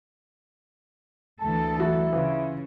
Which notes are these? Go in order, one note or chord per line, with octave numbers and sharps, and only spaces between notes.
D2 E3 A4 A5
F#3 E4 F#4
C#3 E3 F4